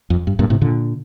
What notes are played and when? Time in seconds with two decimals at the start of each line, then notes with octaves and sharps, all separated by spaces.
0.10 F2
0.27 G2
0.39 G2 A#2
0.50 A2 C3
0.62 A#2 D3